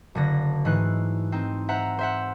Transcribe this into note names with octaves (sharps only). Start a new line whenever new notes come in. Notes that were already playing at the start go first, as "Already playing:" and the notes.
F#1 D3 A#6
G#2 E3 A3 D#4 F#6 C7
C4 D#4
C5 E5 F#5 A#5 C7
C5 E5 F#5